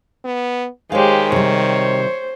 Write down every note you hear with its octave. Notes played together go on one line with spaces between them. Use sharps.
B3
D#3 G#3 G4 C5 C#5 F5
C3 G3 C5 C#5